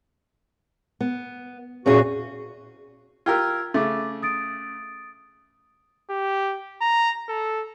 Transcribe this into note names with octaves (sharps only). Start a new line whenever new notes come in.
B3
E2 A#2 C#4 F#4 G#4
F4 G4 A#4 E6 F6 G#6
C#3 A3 D6 A6
D#6 A6 D7
G4
A#5
A4